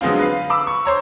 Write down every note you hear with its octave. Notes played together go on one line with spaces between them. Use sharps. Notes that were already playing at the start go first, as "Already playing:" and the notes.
D3 F#3 G#3 B3 C4 F4
B4 F5
B5 D6 E6
C#6
C5 C#5 A#5